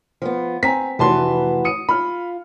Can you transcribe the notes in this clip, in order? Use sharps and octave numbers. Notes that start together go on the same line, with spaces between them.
F3 B3
C4 G#5 A#5 B6
F1 E3 F#4 B4 A5 C6
D#6 C#7 D#7
F4 B5 F6